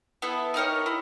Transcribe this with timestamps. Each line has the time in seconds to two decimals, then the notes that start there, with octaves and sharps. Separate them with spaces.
0.22 B3 E4 A4
0.54 D#4 G4 A#4 C#5
0.86 E4